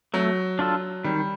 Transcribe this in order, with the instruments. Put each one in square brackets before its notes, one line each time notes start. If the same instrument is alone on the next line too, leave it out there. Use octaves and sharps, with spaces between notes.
[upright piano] F#3 [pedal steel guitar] A3
[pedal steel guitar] D4 F4 A4
[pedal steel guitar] D#3 [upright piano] G3